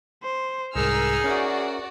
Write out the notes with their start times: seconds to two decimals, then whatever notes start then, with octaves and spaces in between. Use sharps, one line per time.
0.24 C5
0.76 C2 G#2 D#4 G#4 A#4 E6 F6
1.24 C#4 F#4 A#4 D5 E5